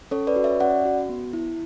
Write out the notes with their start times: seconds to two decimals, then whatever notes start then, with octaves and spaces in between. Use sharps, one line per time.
0.11 C#4 A4 C#5
0.27 B4 D5
0.36 F#4
0.44 C#5 E5
0.60 C#4 D5 F#5
0.85 F#4
1.09 B3
1.33 E4